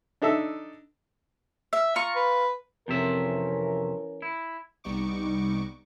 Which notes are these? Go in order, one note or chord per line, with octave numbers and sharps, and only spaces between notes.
D4 D#4 A4 E5
E5
F4 A#5 C#6
B4
F2 C3 E3 C#4 A#4 E5
E4
C2 G3 B3 D#4 C#6 D6